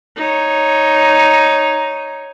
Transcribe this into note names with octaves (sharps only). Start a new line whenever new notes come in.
D#4 C#5